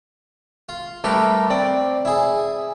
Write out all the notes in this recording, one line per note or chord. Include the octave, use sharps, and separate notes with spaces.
F4
G3 A3 G4 A#4 B4
C4 D5
E4 G#4